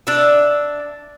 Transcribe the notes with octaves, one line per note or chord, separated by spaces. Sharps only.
D4 E5